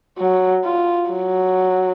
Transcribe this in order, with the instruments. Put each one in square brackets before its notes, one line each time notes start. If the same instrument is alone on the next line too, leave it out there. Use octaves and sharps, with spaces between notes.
[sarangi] F#3
F4
F#3